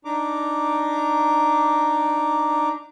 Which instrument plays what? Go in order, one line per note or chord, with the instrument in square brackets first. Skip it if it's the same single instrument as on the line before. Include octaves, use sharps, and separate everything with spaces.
[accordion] D4 D#4 A#5 D6